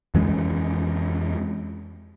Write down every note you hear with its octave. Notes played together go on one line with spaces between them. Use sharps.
F2 E3 G#3 C#4